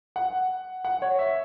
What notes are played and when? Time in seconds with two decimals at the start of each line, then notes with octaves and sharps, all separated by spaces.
0.16 F#5
0.85 F#5
1.02 C#5
1.19 E5